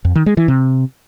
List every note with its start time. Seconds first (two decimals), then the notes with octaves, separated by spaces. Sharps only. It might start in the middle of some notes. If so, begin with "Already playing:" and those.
0.05 F2
0.16 D#3
0.26 G#3
0.37 E3
0.48 C3